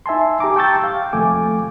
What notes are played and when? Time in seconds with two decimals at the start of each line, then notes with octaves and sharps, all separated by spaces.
0.06 D#4 E5 G#5 A5 C6
0.40 G4 G#5 A#5 D6
0.56 G5 A5 C#6 E6 G6 A6
0.84 F5
1.13 D#2 C3 F3 A3 G#5 D6